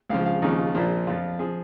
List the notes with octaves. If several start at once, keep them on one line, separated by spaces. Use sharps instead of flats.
C#2 C#3 F3 F5
F5
D#2 C#3 F3 D#4
F4
A#1 A#2 F3
F2 F3 F4
F3 G#4